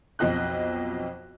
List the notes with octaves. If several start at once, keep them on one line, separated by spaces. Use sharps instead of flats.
B1 F2 D#5 F#6